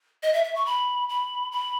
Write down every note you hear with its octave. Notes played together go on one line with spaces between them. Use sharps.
D#5
E5
E5
C#6
B5
B5
B5